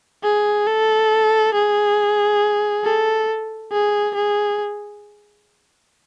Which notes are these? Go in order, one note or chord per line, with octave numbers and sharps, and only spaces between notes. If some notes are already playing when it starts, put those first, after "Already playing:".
G#4
A4
G#4
A4
G#4
G#4